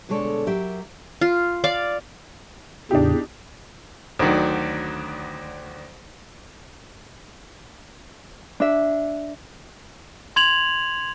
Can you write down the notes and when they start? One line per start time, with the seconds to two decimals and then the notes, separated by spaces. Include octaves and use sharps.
0.09 B2 D3 G#3 A4 C#5 D5
0.47 F#3 G4 A#4 E5
1.21 F4
1.64 D5 F5
2.91 E2 A2 C#3 D4 D#4 G4
4.19 D2 D3 D#3 F#3
8.60 D4 E5
10.36 C6 G#6 F7 F#7